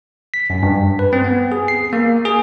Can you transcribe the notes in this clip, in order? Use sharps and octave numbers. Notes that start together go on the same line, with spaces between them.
B6
F#2
G2
B4
C4
B3
G#4
C7
A#3
G#4